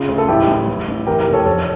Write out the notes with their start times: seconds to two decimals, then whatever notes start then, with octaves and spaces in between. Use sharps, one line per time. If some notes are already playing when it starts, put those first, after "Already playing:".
Already playing: C#3 F4
0.09 D2
0.18 A4
0.29 A1 E4 G4
0.48 A1
0.67 A1
0.88 A1
1.07 E3 G4 A#4
1.20 G4 A#4
1.27 F1
1.33 A4 C#5
1.46 F3 A4 C#5